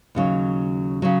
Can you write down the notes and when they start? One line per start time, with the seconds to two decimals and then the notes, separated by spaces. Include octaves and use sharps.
0.15 D#2 C#3 F#3
1.02 C#3 F#3